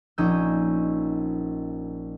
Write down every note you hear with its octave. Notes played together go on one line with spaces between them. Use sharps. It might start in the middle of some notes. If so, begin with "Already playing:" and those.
A#1 C#4 D#4 D#5 E6 G6